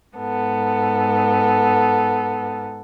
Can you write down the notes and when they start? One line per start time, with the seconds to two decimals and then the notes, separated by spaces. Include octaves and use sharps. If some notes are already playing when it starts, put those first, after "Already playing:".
0.17 G#2 B3 A4